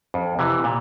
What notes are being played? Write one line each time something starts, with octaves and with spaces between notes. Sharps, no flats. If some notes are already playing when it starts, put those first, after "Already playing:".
F2
C3 E3
A#2